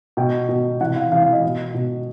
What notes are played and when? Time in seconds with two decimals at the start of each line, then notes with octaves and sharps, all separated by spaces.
0.17 B2 G5
0.49 B2
0.81 C3 E3 F#5
0.96 F5
1.12 C3 E3 F5
1.22 F5
1.33 D#5
1.43 B2
1.74 B2